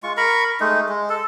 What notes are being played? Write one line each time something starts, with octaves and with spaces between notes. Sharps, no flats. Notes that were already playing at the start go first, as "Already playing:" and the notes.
G#3 F4 C#6
A#4 A#5 B5 C#6
G#3 A3 D#4
G#3
A4